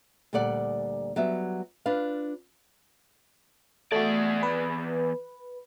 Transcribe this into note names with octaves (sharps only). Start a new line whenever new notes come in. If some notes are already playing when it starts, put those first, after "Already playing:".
D2 A#2 G3 A4 D5 F#5
F#3 G3 B3 E5
D4 F4 B4 F5
E2 A3 F#4 D5
B4